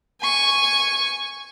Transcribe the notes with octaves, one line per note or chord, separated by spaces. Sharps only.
G#5 C#6